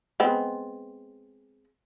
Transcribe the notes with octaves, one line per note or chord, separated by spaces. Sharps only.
G#3 B3 C4